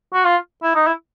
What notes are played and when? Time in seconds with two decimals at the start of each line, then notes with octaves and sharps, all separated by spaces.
0.13 F#4
0.24 F4
0.63 E4
0.75 D#4
0.87 E4